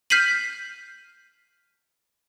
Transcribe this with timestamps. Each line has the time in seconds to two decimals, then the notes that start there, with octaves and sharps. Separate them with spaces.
0.10 F6 G6 B6 C7 D#7 F#7